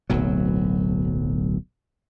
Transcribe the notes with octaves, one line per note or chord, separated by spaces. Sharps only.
D1 B1 F#3